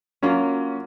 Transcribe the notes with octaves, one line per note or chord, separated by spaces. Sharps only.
F#3 A#3 C#4 F4